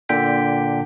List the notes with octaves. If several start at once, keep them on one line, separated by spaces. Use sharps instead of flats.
A#2 D3 G5 B6